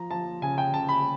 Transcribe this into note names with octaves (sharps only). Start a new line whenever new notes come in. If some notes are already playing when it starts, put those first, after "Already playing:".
Already playing: F3 A#5
F3 A5
C#3 G#5
G5
C#3 A5
B5